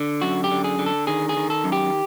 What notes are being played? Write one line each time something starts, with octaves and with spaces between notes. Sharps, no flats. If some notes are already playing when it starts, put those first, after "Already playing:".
Already playing: D3
F#2 F#4
G4
D3
G#4
D3
A4
D#3 G#4
G#4
D#3
A4
F#2
G4